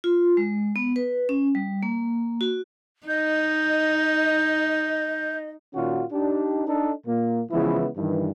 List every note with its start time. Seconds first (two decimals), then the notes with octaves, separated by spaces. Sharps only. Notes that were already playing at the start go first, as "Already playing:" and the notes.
0.04 F4
0.37 G#3
0.76 B3
0.96 B4
1.29 C#4
1.55 G3
1.83 A#3
2.41 F#4
3.07 D#4 D#5 G6
5.74 A#2 D#3 C#4 F4 F#4
6.12 D4 D#4 G4
6.67 D4 D#4 A4
7.06 A#2 A#3
7.51 C#3 E3 F3 G#3 B3 E4
7.96 G2 D#3 E3